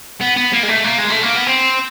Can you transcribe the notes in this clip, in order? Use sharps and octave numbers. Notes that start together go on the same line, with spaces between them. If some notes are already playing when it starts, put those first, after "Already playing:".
B3
B3
A#3
G#3
A3
A#3
G#3
A3
A#3
B3
C4